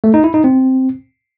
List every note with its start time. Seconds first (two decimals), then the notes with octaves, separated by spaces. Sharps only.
0.04 A3
0.14 D#4
0.24 E4
0.34 D#4
0.44 C4